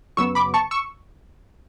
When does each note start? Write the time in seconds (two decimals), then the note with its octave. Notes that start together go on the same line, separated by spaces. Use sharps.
0.17 F#2 C#3 F#3 B3 C#6 E6
0.35 B5 D6
0.54 A5 C#6
0.71 C#6 E6